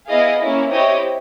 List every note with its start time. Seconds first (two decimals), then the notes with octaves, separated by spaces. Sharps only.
0.08 B3 E4 G#4 D#5 F5
0.40 A#3 C#4 E4
0.71 C4 E4 G4 C#5 D#5